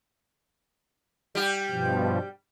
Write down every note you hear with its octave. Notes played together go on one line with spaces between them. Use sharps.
G3 G4
G2 B2 F3